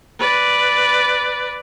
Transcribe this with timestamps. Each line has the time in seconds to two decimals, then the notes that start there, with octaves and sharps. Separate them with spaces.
0.19 B4 D5